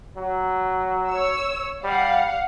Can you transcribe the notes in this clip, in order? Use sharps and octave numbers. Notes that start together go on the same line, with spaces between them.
F#3
C#5 E6
G3 F5 F#5